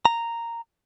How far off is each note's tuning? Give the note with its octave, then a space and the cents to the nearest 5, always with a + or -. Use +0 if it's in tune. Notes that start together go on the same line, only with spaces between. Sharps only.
A#5 -5